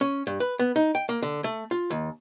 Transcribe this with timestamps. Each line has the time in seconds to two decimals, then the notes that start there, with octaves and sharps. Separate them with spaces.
0.01 C#4
0.27 G2
0.40 B4
0.59 B3
0.76 D#4
0.95 G5
1.09 A#3
1.23 D3
1.44 A3
1.71 F4
1.90 D#2